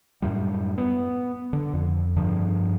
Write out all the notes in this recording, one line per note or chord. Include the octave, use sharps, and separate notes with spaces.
F#2 A2 G3
B3
D3
F2
G2 D3 F3